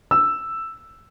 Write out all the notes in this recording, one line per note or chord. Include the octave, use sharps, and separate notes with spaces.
E6